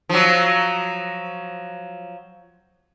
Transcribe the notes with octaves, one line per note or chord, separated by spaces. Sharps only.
F3 F#3